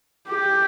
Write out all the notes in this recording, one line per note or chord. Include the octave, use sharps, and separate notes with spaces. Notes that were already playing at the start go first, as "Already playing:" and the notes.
G4